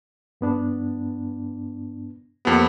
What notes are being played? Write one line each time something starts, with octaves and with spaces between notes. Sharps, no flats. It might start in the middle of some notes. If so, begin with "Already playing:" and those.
G2 B3 D4
F2 A#3 B3 G4 F#5